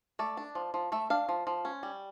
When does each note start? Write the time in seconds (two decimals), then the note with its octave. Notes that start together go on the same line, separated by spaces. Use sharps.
0.19 A3 D5
0.37 D4
0.55 F3
0.74 F3
0.92 A3 E5
1.10 D4 F5
1.29 F3
1.47 F3
1.65 C#4
1.83 G3